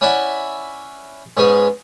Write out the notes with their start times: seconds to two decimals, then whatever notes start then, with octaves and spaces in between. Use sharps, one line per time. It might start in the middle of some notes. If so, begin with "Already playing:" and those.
0.01 C#4 E4 D5 E5 F#5 B5
1.37 G#2 B3 C#4 G#4